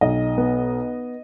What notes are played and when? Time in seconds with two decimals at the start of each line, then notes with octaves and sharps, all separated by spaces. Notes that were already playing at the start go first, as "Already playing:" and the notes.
0.01 B1 D#5
0.38 B3